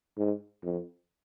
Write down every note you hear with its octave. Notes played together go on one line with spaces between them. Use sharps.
G#2
F2